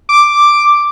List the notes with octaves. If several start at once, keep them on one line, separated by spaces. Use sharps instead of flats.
D6